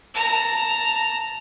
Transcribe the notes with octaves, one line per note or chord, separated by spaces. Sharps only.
A5 A#5